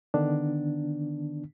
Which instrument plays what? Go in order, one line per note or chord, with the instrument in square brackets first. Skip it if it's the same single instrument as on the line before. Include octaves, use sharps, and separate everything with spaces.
[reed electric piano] D3 D#3 B3 D4